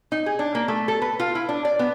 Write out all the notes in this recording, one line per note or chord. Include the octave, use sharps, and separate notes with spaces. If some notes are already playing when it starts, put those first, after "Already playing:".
D#4
G#4
D4
A#3
A3
A4
B4
F4
E4
D4
D5
B3